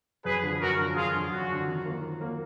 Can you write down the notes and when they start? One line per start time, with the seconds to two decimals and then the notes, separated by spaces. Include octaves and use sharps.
0.25 F#2 G#4 B4
0.43 D3 F3
0.61 F#2 F#4 A#4
0.78 D3 F3
0.96 F#2 F4 G#4
1.13 D3 F3
1.31 F#2 F#4
1.49 D3 F3
1.67 D#3
1.85 F#3 A#3 F4
2.01 D#3
2.20 F#3 A#3 F4